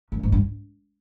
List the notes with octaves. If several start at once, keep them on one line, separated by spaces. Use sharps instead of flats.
F#2
G#2
G2